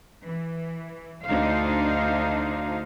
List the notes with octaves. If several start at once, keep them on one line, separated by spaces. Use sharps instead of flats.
E3
D2 D4 D#4 C5 F5